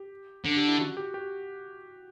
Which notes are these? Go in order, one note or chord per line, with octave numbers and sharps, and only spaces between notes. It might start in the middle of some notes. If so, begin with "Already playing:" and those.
Already playing: G4
D3
G4
E4
F#4
G4
G4